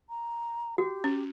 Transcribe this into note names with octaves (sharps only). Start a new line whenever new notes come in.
A#5
F#4 G4
C#4